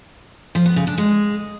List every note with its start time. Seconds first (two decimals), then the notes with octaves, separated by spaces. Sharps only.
0.55 F3
0.66 B3
0.76 C#3
0.87 D4
0.98 G#3